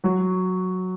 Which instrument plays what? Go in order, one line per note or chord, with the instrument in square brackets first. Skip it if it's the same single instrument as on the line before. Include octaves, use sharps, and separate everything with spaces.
[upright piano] F#3 F#4